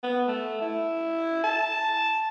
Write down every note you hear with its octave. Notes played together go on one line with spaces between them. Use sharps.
B3
A3
E4
A5